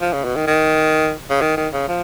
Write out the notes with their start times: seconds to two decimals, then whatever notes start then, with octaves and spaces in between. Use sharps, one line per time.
0.02 F3
0.13 C#3
0.25 B2
0.36 D#3
0.47 D#3
1.30 C#3
1.41 D#3
1.57 D#3
1.73 C#3
1.88 F3